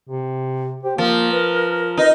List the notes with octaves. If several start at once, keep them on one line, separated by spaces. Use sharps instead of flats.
C3
G4 C5
F3 A#3 A#4
B4
D#4 B4